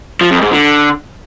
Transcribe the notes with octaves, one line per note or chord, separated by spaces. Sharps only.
F3
F2
G#2
D3